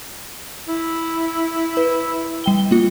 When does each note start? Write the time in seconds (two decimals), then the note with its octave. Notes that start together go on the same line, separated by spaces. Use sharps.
0.68 E4
1.77 B4
2.44 G3 G5 G7
2.71 A#3 F4